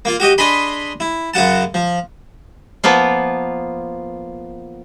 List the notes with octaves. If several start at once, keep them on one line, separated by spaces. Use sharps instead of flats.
A#3 F4
F#4 G4 D#5
D4 G#4 D#5 B5 C6
E4
F#2 C#3 F#4 F#5 A5
F3
F3 A#3 B3 F4